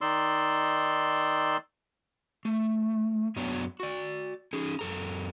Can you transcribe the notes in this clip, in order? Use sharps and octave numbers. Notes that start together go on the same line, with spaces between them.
D#3 D#4 D5 C6 E6
A3
F#2 F#3 B3 D4 C#5 A#5
F#4 D5
C#4 D#4 G#4
F#2 A4 A#5